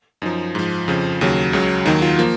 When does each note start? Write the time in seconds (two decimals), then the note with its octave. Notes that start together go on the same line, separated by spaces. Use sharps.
0.22 F#2 F3 D#4
0.55 G#2 F3
0.88 F2 C#3 F3
1.21 D#2 C#3 F#3
1.53 C#2 C#3 F#3
1.85 D#2 D#3 F#3 D#4
2.02 F4
2.19 F3 A#3